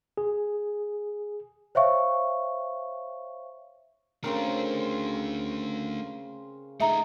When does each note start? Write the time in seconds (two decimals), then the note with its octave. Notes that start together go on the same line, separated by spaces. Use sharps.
0.18 G#4
1.75 C5 C#5 E5 F5 C#6
4.24 C#3 A3 C4 D4 A#4
6.80 A3 D#4 G#4 E5 A#5